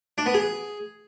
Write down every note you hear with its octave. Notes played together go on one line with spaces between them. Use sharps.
D4
B3
G#4